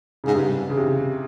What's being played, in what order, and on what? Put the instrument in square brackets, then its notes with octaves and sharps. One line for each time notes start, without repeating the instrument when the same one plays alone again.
[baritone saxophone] G#2 [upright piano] C#3
[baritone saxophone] G2 [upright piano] C3
[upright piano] C#3
C3